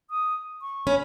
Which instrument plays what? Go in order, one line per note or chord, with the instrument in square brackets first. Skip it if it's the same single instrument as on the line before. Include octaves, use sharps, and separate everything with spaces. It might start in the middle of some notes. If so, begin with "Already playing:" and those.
[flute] D#6
C#6
[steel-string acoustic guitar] C#4 [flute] B5